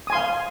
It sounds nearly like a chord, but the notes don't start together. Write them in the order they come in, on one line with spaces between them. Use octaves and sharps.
D#6 G#5 C6 F5